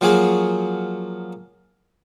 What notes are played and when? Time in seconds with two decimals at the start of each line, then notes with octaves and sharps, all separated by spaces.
0.01 F3 F#3 A#3 F#4 G#4